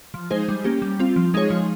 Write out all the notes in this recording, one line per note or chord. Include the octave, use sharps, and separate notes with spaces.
F3
G#3 D#4 G#4 C5
G3
A#3 C#4 G4
G3
C4 F4
F3
G#3 D#4 G#4 C#5
F3